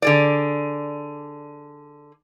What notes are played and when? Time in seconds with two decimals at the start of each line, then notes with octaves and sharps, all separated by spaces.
0.02 D3 G#4 D5